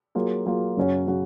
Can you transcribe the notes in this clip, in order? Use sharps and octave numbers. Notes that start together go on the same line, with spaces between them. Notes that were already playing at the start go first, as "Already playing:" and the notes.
F#3 A#3 F4 G#4
F#3 A#3 F4 G#4
F#2 C#3 F#3 C#4 F#4
C#3 F#3 C#4 F#4